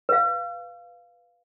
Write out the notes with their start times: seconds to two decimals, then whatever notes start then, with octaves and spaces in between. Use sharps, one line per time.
0.09 B4 F5